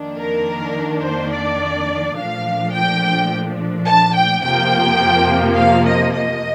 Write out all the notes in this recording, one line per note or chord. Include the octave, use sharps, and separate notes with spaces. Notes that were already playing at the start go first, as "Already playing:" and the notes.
Already playing: F2 D#3 A#3 D4
A#4
C5
D5
A#2 F3 A3 D4 F5
G5
A5
G5
F2 C3 F3 A#3 G5
F5
D#5
D#5